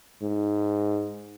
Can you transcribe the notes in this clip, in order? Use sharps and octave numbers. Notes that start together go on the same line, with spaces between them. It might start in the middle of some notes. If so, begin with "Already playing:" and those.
G#2